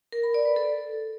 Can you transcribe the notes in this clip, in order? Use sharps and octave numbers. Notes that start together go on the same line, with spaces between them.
A#4
B5
D5
B4
A4